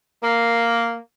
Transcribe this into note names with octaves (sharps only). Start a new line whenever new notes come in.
A#3